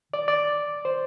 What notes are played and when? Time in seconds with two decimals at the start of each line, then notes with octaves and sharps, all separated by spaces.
0.14 D5
0.28 D5
0.85 C5